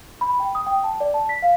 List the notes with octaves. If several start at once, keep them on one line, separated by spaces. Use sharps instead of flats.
B5
G5
D#6
G5
A5
D5
A5
B6
F5